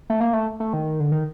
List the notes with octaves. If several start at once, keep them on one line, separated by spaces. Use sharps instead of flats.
A3
A#3
A3
A3
D#3
D3
D#3